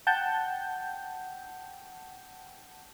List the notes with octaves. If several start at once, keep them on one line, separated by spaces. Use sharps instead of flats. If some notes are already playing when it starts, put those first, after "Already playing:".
F#5 G5 A5 G6